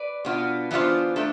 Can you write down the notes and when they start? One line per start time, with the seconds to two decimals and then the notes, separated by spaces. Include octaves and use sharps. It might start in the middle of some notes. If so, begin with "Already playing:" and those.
Already playing: B4 D5
0.25 B2 B3 D4 F4
0.71 E3 B3 D4 F4 C5
1.16 A3 D4 A4